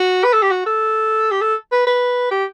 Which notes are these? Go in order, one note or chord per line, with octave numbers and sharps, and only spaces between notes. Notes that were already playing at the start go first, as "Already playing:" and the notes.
Already playing: F#4
B4
A4
G4
F#4
A4
G4
A4
B4
B4
G4